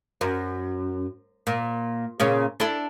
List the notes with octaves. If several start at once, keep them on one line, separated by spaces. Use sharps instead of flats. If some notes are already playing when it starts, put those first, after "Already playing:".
F#2
A#2
A#2 C#3 C#4
D4 E4 A4